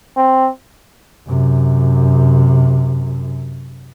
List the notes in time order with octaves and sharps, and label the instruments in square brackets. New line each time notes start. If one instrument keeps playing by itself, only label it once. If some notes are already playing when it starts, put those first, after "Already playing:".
[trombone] C4
[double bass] F#2 C3